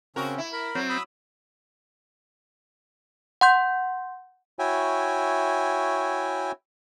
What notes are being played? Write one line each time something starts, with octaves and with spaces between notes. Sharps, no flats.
C#3 C4 C#4 F#4 A#4
E4
A#4 B5
F#3 C4
B5 D#6 E6
F#5 C6 G6
E4 F#4 C#5 E5 G5 G#5